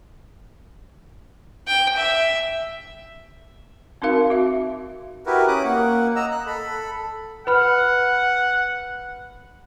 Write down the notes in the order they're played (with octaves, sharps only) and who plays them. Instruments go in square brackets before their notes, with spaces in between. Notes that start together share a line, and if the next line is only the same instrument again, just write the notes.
[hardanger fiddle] G5
E5
[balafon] C4 D#4 F#4 A#4 F5
F#4 E5
[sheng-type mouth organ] E4 F#4 G4 A#4 B4
C#4 D6 D#6 F#6
A#3 F#5
D#5 A#5 E6
F#6
A4 B5
[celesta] B4 B5 F6 [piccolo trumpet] F#5